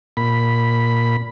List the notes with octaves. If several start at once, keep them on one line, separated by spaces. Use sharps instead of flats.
A#2 B5